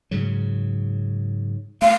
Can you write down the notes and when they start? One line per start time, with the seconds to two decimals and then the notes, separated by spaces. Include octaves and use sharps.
0.11 G#2 C#3 F#3
1.82 A3 F5